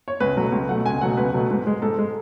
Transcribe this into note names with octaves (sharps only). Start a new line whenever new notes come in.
C#5
C#2 B4
B2 F#3 A3
C#2
B2 F#3 A3 F#5
C#2 G#5
B2 F#3 A3 F#5
C#2 B4
B2 F#3 A3
G#2
G#3
G#2 A4
G#3